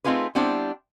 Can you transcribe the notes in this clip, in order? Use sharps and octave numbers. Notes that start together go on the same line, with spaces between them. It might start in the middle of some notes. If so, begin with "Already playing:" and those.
A3 C4 D#4 F4 G#4 B4
G3 B3 C4 D4 E4 C5